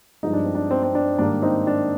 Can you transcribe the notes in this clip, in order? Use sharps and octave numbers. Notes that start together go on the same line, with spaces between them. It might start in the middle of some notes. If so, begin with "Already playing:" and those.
G2 F3 G#3 D#4
D4
C4
D4
C4
C4
D4
G#2 D#3 G3 A#3 D4
C4 D#4
D4